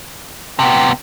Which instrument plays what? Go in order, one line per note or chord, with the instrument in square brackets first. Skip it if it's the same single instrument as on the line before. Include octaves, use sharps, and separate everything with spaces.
[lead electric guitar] C3 B3 [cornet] G5